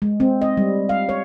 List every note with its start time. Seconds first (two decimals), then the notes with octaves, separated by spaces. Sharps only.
0.02 G#3
0.20 C4
0.42 D#5
0.57 G3
0.89 F5
1.09 C#5